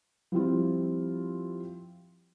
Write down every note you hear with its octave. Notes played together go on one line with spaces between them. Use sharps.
F3 G3 C4 E4 F4